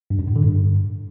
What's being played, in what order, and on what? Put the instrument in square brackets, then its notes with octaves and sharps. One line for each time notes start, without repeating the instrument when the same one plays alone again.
[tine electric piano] G2
F#2
A2
D3
G2